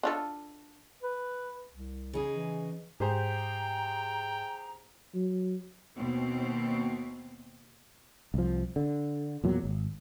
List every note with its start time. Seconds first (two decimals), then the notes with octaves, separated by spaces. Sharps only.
0.03 D4 F4 A4
1.03 B4
1.70 C2
2.13 C#3 D#4 G#4
2.34 E3
3.00 G#2 G4 G#4 C5 G5 A#5
5.14 F#3
5.96 D#2 B2 C4
8.34 C2 F3
8.76 D3
9.44 E2 A#2 F#3
9.64 G#1